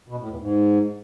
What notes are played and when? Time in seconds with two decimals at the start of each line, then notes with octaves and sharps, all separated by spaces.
0.09 B2
0.19 A2
0.29 E2
0.39 G#2